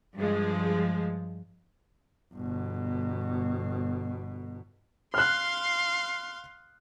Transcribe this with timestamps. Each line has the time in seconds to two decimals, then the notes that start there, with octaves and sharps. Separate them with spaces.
0.17 G2 F3 G#3
2.33 G1 B2
5.14 F5 C6 F6 F#6